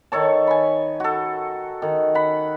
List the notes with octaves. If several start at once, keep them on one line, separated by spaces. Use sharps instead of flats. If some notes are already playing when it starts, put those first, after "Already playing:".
D#3 A4 C#5 A5
G#5 B5
F#4 A4
D#3
F#5 B5